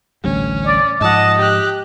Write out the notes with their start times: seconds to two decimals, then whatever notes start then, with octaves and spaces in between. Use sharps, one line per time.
0.24 A1 D2 G3 C#4
0.66 D5
1.01 G#2 F3 D#5 F#5 A5
1.38 G4 F#6